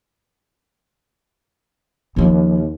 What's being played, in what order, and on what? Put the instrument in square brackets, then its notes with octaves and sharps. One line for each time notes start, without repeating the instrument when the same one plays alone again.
[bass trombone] D#2 [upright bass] C#3 F3